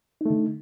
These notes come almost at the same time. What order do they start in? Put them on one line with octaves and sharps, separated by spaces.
D#4 A3 D3